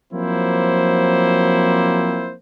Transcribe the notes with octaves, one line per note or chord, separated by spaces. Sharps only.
F3 F#3 A#3 C4 E4 C5